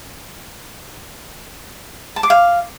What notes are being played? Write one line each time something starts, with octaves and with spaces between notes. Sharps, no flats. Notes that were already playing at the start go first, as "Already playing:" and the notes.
A5
D6
F5